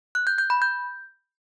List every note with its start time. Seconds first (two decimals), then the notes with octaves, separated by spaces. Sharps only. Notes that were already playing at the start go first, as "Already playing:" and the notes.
0.15 F#6
0.27 G6
0.38 G6
0.50 B5
0.62 G6